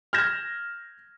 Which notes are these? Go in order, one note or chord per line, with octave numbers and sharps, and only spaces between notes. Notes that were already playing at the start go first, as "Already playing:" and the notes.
F6 G6 G#6 A#6 E7